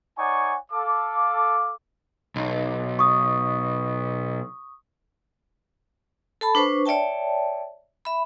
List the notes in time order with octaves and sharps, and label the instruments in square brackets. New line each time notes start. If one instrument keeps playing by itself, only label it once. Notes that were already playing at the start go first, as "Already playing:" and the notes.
[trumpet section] D#4 C#5 D5 F#5 G#5 C#6
A4 F5 D6
[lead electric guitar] B1
[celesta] C#6 D#6
[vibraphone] A4 A5 B5
D4 B4 C5 C#6
C#5 D5 E5 G5 A5
E5 B5